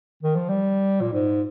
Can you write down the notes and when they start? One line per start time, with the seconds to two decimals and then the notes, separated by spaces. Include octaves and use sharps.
0.23 D#3
0.35 F3
0.49 G3
1.01 A#2
1.13 G#2